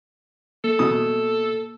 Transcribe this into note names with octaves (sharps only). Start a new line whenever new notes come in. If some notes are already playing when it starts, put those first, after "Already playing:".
A#3 A4
B2 D#6